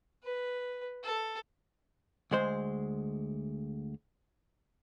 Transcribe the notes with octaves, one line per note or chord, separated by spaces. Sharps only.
B4
A4
D2 G#3 C5